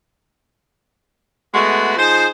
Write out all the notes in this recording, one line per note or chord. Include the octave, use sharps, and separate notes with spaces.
G#3 A3 B3 F#4
F3 D#4 G#4 C5